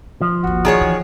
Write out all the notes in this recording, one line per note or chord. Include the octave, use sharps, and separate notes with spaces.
F3
G#1 D#2 F#4
D#3 G#4 C#5
D#2 E3